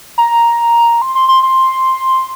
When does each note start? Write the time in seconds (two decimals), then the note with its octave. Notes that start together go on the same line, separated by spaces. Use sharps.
0.18 A#5
1.02 C6
1.15 C6
1.28 C6
1.43 C6